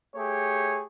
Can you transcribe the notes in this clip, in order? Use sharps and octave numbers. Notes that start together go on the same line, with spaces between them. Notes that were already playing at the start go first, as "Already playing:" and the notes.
A3 G4 G#4 C#5